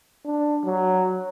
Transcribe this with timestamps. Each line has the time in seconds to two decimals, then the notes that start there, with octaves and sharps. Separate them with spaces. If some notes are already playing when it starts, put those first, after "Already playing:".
0.25 D4
0.64 F#3